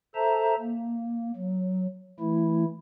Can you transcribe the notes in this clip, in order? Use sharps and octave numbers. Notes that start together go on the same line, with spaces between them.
A4 C5 E5 A5 A#5
A#3
F#3
E3 A3 E4